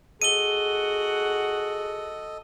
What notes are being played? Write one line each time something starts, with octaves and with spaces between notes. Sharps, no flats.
F#4 G#4 A4 D#5 F#5 D#7 G7